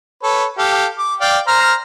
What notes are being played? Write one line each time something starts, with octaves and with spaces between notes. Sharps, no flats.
A4 B4 C#5
G4 A4 F5
D6
D5 F5 G5
C5 A#5 F6